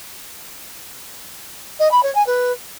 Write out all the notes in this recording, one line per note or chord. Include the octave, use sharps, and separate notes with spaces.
D#5
B5
C#5
G#5
B4